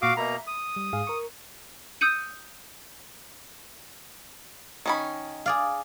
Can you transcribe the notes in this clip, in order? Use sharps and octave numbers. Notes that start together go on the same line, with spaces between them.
A#2 F#4 F5 D6 D#6
B2 A#3 E5 A#5 B5
D#6
G3
G#2 G#4 F5
A#4 C#6
D#6 E6 G6 C#7 D#7
D#3 C#4 B5
G#4 D5 F5